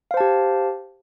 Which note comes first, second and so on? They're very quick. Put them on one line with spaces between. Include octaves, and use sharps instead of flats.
F5 C5 A5 G4